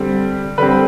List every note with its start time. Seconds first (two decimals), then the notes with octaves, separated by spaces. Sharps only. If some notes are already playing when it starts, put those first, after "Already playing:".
Already playing: D3 G3 C4
0.58 D3 G3 C4 B4